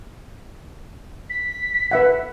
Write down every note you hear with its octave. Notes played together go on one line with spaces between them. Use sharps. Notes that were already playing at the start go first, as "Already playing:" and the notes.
B6
B4 E5 F#5